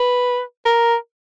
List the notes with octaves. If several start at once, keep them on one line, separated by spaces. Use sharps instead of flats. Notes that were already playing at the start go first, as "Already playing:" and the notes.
Already playing: B4
A#4